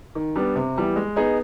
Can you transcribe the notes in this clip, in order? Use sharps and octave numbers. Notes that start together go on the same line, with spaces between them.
D#3
G3 B3 D4
C3
E3 G3 B3
G#3
B3 D#4 G#4